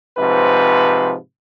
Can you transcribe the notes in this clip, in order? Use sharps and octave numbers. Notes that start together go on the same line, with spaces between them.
G#2 C3 F3 B4